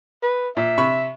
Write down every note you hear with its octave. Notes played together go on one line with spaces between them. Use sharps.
B4
A#2 E5
C3 B5 C#6